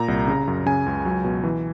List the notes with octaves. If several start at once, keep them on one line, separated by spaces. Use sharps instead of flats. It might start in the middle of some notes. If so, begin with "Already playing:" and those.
Already playing: A#2 A#5
C2
C#3
F#2
C#3 G#5
C#2
F#3
B2
E3